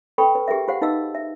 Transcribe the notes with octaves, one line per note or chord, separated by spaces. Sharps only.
A4 B4 G5 B5 C#6
B4
G4 G#4 A#4 B4 E5
F4 G4 C5 F5 F#5
D#4 F4 B4 D#5 F5 E6
E5